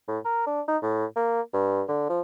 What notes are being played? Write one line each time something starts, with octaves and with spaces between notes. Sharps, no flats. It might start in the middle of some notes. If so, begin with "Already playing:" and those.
A2
A#4
D4
D#4
A2
A#3
G2
D3
F3